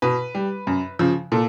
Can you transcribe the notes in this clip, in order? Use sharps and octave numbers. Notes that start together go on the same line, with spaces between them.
B2 B4
G3
F#2
C#3 F3
A#2 A4